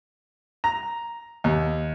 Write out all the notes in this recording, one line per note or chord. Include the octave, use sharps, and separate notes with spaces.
A#5
D#2